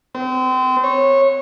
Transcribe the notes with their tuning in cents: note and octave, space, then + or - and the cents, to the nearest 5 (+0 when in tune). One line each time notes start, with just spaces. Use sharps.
C4 -30
C#5 -25